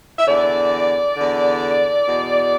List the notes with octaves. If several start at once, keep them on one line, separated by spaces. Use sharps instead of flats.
E5
E2 D3 D5
E2 D3
E2 B2